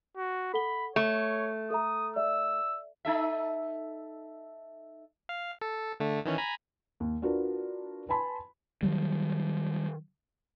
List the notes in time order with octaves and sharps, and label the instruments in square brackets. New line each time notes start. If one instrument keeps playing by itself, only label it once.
[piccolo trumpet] F#4
[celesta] A4 F#5 G7 [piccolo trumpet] B5
[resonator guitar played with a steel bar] A3 [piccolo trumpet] C#5 [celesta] C#6
[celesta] A4 E5 A#5 [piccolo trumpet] D#6
[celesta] D5 E5 [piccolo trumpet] E6
[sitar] D#4 A4 E5
[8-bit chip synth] F5
A4
D3 A3
D#3 E3 C#4
G#5 A#5 B5
[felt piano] D#2
D4 F4 F#4 A#4 B4
B4 G#5 A5 B5 C6
[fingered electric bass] D#3 F#3 G3